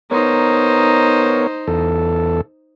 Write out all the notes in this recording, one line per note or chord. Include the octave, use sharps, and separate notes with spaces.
B3 D#4 A#4 C5 C#5
E2 A4